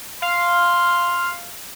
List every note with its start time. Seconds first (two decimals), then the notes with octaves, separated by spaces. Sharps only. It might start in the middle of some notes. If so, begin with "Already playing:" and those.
0.22 F5 C6